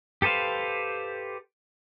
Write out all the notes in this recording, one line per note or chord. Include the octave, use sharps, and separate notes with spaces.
G4 A4 B4 C5 F5